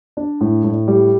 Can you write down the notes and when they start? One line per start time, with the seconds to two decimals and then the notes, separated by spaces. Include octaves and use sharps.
0.17 D4
0.41 A2
0.64 A2
0.88 G3